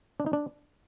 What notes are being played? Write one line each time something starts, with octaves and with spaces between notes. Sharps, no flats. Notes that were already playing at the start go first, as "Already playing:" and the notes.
D4
D#4
D4